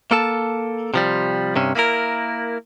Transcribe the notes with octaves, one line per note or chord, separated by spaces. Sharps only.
A#3 A4 A5
C3 F3 G3
G2 C3 C#4
A#3 E4 G#4 A#4